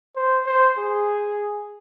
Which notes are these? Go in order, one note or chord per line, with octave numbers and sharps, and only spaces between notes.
C5
C5
G#4